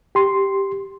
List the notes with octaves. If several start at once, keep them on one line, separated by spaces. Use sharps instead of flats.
G4 C6